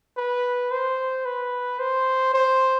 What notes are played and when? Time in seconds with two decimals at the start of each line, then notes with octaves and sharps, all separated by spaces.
0.17 B4
0.71 C5
1.25 B4
1.79 C5
2.34 C5